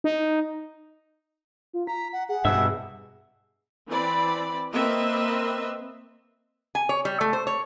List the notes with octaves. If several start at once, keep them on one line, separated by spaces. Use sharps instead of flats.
D#4
F4
A#5 B6
F#5
G#4 F#5
G2 B2 E5 E6
E3 C4 D5 B5
A#3 C4 B4 D#5 E5
G#5
C#5
G3
A3
C5
C#5